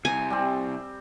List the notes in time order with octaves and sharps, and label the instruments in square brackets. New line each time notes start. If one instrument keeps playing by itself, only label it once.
[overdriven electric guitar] C2 C3 [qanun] G#5
[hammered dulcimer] G3 C4